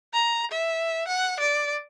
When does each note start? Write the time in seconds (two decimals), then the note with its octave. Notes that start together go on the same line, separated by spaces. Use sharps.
0.13 A#5
0.51 E5
1.08 F#5
1.40 D5